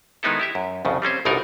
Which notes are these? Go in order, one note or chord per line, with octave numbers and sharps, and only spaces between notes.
D#3 G#3 B3 D#4 E4 A4
E4 G4 E5
F#2
C2 F2 C#3
G3 C4 C#4 C5
G1 C2 B2 D#4 A#4 D5